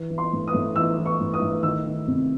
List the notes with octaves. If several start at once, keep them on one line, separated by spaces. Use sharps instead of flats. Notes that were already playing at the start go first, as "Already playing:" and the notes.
Already playing: E3
E3
C6
A2
D#6
A2
E3 E6
E3
C#6
A2
D#6
A2
D#3 E6
D#3
C3